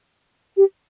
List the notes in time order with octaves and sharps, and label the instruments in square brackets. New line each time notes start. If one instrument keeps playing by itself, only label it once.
[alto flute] G4